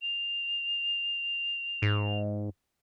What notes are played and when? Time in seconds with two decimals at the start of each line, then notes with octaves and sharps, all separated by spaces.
0.02 F7
1.82 G#2